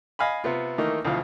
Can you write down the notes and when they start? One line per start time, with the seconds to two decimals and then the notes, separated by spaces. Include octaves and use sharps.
0.19 D#5 F5 G#5 B5
0.44 C3 B3 F4
0.78 D#3 E3 A3 A#3 D#4
1.05 D2 B2 E3 F3 F5